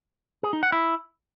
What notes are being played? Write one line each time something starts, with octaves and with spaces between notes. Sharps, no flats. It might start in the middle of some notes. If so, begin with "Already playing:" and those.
G#4
D#4
F#5
E4